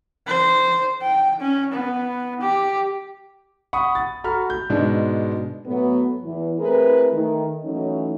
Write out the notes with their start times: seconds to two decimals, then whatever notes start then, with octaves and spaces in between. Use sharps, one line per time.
0.27 C5
1.02 G5
1.40 C#4
1.72 B3
2.41 G4
3.73 F#5 B5 C#6 D#6
3.95 A6
4.24 F#4 A4 A#5 B5 F6
4.50 G6
4.69 G#2 B2 G#3 D4
5.66 A2 F#3 A3 B3
6.23 E2 E3
6.58 A3 C4 E4 G#4 A#4 B4
7.11 D#3 A3
7.63 E3 F#3 A3 C#4 D#4